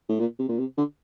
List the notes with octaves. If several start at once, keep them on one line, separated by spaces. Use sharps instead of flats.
A2
A#2
C3
A#2
C3
D3